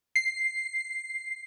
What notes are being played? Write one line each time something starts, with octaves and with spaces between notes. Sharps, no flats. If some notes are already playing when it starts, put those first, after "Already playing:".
C7